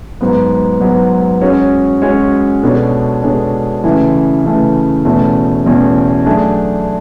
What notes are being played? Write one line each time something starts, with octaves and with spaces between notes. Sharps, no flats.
G#2 F#3 B3
G#2 F#3 B3
G#3 C#4 F#4 C#5
G#3 C#4 F#4 C#5
B2 G#3 D4 A4 C#5
B2 G#3 D4 A4 C#5
C#3 E3 A3
C#3 E3 A3
E2 B2 A3 C#4
E2 B2 A3 C#4
F#3 A3 D4 G#4